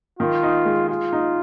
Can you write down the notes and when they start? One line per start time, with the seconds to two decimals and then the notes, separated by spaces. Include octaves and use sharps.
0.19 D#3 F4
0.43 D#4
0.65 G#3
0.89 F4 G#4
1.13 D#4